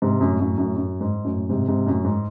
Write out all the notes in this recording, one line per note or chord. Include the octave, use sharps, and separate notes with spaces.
G#2 C3
F#2 A2
F#2 A2
F#2 A2
F#2
G#2
F#2 A2
G#2 C3
G#2 C3
F#2 A2
G#2